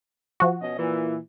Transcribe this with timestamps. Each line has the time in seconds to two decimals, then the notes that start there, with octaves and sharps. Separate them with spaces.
0.40 F3 F#4
0.61 B2 C#4 D#5
0.79 A#2 E3